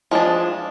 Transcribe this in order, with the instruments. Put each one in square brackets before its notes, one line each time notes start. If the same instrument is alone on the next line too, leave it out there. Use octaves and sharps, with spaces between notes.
[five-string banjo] F3 G#3 D4